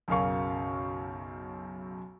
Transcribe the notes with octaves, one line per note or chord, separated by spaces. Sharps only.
B1 F#2 C#3 A#4 F5 C#6